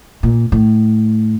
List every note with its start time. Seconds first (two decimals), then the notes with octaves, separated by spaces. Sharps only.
0.23 A#2
0.52 A2